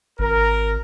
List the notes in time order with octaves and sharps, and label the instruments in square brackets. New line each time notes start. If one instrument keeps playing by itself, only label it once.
[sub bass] G#1 [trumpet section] A#4